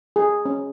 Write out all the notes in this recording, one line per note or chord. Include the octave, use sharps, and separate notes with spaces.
G#4
C#4